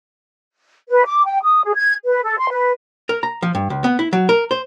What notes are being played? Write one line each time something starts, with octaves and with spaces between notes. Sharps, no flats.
B4
D6
G5
D#6
G#4
G#6
B4
A4
C6
B4
A#4
A#5
F3
G2
C#2
B3
E4
F#3
A#4
C5